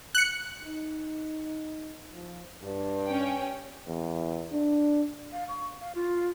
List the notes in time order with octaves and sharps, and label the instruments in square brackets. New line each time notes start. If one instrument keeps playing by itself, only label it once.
[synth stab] F#6 C#7
[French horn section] D#4
F3
G2
[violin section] C#4 G5
[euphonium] E2
D4
[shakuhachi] F5
C#6
F5
F4